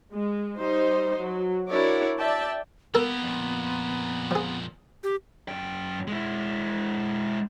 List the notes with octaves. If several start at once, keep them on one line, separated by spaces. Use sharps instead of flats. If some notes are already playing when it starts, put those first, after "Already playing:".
G#3
G3 D#4 C5
F#3
D4 E4 F#4 A#4 C#5 D5
D5 E5 G5 A5
A#3 B3 G4 A4 A#4 A5
F2 A#2
F3 G#4
G4
F#2 G5
G#3 E4